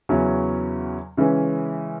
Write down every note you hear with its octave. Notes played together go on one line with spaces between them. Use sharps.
E2 C#3 F#3 C#4 E4
C#3 E3 G#3 C#4